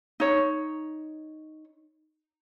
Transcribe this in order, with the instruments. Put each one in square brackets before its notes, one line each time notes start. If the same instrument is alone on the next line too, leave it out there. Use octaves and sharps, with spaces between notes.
[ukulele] D#4 C#5